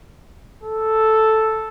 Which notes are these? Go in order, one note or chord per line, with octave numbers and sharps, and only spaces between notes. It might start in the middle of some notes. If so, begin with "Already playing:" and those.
A4